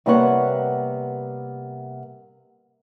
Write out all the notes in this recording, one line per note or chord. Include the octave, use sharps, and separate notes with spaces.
C3 G3 A#3 B3 C#5 F#5